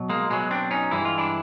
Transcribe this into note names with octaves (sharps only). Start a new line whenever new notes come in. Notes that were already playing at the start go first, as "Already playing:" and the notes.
Already playing: B2 F#3
G#3 A#3
B2 F#3 G#3
C4 D4
C#4 D#4
G2 E3 G#3 E4
F4
D4 E4